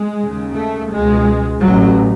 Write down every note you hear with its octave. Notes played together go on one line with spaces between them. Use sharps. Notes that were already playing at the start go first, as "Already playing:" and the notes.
Already playing: G#3
D#2 C#3
A3
C#2 B2 G#3
A1 A2 F#3